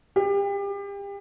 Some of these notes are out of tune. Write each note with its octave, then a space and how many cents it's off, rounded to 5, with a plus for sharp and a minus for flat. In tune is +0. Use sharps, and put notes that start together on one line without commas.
G4 +35